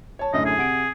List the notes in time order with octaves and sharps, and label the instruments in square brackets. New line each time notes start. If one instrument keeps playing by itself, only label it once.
[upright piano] C#5 A5
[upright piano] F#2 A2 D3 [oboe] D#5
[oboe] G#4
[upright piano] C3 F#5 D7